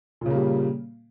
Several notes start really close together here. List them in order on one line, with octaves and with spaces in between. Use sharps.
A#2 C#3 A#3 G3